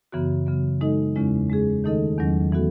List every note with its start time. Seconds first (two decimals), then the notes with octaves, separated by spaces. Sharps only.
0.12 F#2 C#3 E3 B3 F#4
0.47 C#3 F#3 B3
0.81 G#3 D#4 A4 D#5
1.16 E2 C#3 G#3 C#4 E4
1.50 G#3 C#4 G#4
1.84 D#3 A3 D#4 A4 D#5
2.19 E2 D#3 F#3 C#4
2.52 E3 B3 F#4 A4